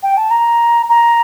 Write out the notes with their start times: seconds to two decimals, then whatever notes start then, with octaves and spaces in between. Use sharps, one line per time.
0.03 G5
0.17 A5
0.31 A#5
0.89 A#5